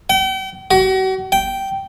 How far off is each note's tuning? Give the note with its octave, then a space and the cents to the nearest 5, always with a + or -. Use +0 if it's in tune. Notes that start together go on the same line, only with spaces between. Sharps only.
G5 -40
F#4 +40
G5 -10